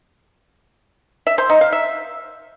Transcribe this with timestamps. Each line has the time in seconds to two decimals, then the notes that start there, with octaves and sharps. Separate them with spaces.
1.27 E5
1.38 C5
1.50 D#4
1.61 F5
1.72 E5